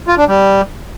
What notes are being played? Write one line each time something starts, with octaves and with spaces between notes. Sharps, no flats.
F4
D4
G3